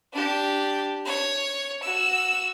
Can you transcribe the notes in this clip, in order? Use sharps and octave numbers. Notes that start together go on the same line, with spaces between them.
D4 G4
C#5
F#4 E6